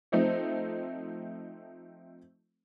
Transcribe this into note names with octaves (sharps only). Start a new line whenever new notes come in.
F3 A3 C4 D#4